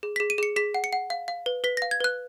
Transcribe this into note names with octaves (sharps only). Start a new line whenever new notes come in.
G#4
G#4 B6
D#7
G#4 C#7
G#4 B6
F#5
C#7
F#5
F5
F5
B4
B4 B6
A#6
F5
G#6
B4 F#6